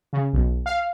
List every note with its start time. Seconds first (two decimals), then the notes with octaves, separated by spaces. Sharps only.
0.13 C#3
0.33 B1
0.66 F5